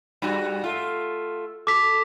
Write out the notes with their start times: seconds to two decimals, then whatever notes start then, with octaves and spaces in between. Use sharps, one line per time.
0.22 G2 G3 F#4
0.64 A3 F4
1.67 A4 D6 B6